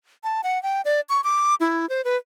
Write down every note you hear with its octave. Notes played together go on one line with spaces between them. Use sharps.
A5
F#5
G5
D5
C#6
D6
E4
C5
B4